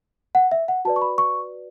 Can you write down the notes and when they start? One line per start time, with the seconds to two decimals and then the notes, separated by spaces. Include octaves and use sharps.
0.35 F#5
0.52 E5
0.68 F#5
0.85 F#4 B4 D5 A5
0.96 C#6
1.01 B5
1.18 C#6